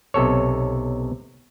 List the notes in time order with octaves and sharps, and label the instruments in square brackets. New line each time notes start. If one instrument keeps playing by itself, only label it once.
[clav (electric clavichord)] B1 C3 A4 C#5